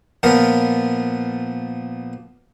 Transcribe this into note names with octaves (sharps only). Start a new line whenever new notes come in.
A#2 F3 B3 A#4